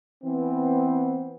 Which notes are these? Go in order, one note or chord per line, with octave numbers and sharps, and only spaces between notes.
E3 B3 C4